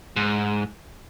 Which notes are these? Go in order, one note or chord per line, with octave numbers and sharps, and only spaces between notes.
G#2